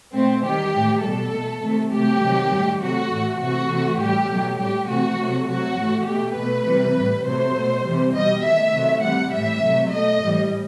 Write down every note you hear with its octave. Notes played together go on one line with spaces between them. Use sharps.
B2 A3 C4
D#3 G3 G4
A2 E3 A3
B2 G3 A4
B2 A3
C3 D#3 A3
C3 F#3 A3 G4
C3 D#3 F#3
A2 G3
C3 F#3 A3 F#4
A2 E3 A3
C3 E3 A3 F#4
C3 E3 A3
A2 G3 G4
B2 F#3 A3
A2 G3 G4
C3 E3 A3 F#4
C3 F#3 A3
C3 F#3 A3 F#4
A2 E3 A3
B2 A3 G4
B2 A3 B4
C3 E3 G3
G3
A2
C3 F#3 A3 C5
B2 A3
C3 E3 G3
B2 G3 D#5
D#3 A3 E5
C3 D#3 F#3 A3
C3 E3 G3 F#5
A2 E3 G3 E5
C3 F#3 A3
B2 A3 D#5
A2 E3 G3